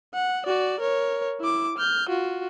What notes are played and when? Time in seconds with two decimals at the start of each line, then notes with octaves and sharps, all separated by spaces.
0.14 F#5
0.46 F#4 D5
0.81 A#4 C#5
1.40 E4 D6
1.78 F6 G6
2.09 F4 F#4